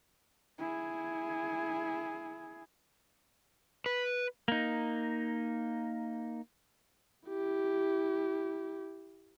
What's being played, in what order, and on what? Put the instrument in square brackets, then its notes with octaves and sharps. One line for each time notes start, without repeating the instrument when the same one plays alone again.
[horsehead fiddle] E4 G#4
[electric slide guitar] B4
[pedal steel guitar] A#3 D#4
[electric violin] E4 G4